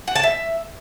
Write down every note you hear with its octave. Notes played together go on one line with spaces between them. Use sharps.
F#5
A5
E5